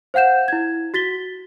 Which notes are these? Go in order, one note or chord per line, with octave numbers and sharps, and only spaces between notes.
C5 F5 F#5 G6 E7
E4 G#6
F#4 A6 B6 G7